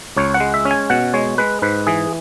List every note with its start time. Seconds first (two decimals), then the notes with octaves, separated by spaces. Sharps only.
0.17 C#2 C#5
0.34 F#5
0.40 G#3
0.54 E5
0.65 C#4
0.71 G#5
0.90 B2 F#5
1.14 G#3 C#5
1.38 G#3 B4
1.62 G#2 B4
1.87 E3 G#4